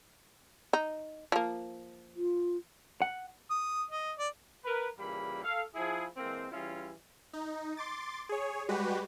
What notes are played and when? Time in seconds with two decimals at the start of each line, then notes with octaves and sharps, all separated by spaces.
0.73 D#4
1.32 F3 A#3
2.16 F4
3.02 F#5
3.51 D#6
3.91 D#5
4.19 D5
4.65 A#4 B4
4.99 A#2 C#3 E3 G3 A#3 B5
5.44 A4 F5
5.75 F3 E4 G#4
6.17 E3 G#3 A#3 C4
6.52 E3 G3 C#4 E4 F4 G#4
7.33 D#4
7.77 C6 D6 A6
8.29 G#4 C#5
8.69 G3 G#3 F#4 G4 B4